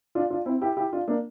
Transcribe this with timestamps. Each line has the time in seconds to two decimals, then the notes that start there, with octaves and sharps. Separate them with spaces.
0.15 D4 F4
0.30 D4 F4
0.46 C4 E4
0.61 E4 G4
0.77 E4 G4
0.93 D4 F4
1.08 A#3 D4